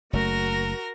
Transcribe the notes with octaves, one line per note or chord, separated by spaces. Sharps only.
F#1 A3 F#4 A#4 A#6